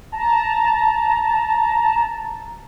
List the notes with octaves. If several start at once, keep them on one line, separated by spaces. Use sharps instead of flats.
A5 A#5